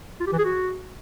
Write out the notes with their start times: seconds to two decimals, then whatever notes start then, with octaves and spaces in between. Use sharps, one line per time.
0.20 F4
0.26 G4
0.32 E3
0.38 G#4
0.44 F#4